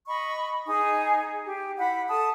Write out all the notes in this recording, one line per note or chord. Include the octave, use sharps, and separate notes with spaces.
D#5 B5 C#6
D#4 G#4 G#5 D#6
G4
E4 F#5 B5
A4 A5 D#6